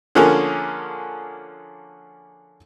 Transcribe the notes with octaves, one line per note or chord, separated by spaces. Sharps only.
D3 F3 A#3 C#4 G#4